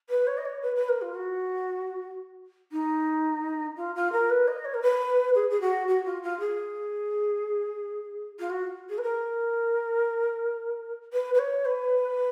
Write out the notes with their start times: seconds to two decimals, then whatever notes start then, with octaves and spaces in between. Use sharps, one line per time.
0.09 B4
0.27 C#5
0.37 D#5
0.45 C#5
0.62 B4
0.75 B4
0.89 A#4
1.01 F4
1.14 F#4
2.72 D#4
3.77 F4
3.95 F4
4.12 A#4
4.30 B4
4.47 D#5
4.65 C#5
4.74 A#4
4.82 B4
5.35 G#4
5.50 G#4
5.60 F#4
5.88 F#4
6.05 F4
6.22 F4
6.40 G#4
8.39 F4
8.50 F#4
8.89 G#4
8.98 B4
9.02 A#4
11.13 B4
11.34 B4
11.39 C#5
11.65 B4